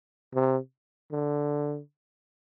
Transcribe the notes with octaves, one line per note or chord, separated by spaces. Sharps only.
C3
D3